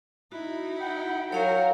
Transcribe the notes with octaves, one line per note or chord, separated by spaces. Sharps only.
D#4 E4 F#4
F#5 G5
F#3 A#4 C#5 F5